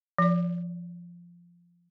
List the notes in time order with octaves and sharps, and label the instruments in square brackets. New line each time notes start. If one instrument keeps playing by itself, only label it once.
[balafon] F3 D5